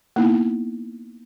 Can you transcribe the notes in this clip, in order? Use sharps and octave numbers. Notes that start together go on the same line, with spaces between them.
A#3 B3 D#4 E4